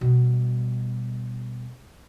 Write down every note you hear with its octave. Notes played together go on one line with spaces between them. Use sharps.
B2 G3